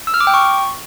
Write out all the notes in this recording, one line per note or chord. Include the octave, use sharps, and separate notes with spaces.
E6
F6
D6
G5
C#6